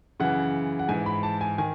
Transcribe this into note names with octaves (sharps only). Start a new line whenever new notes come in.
F#2 C#3 E3 F#5
F#5
G#2 E3 G#5
B5
A5
G#5
D#3 G#5